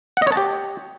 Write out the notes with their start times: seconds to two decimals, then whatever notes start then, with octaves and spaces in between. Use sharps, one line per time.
0.17 F#5
0.22 D#5
0.27 C#5
0.32 A5
0.37 G4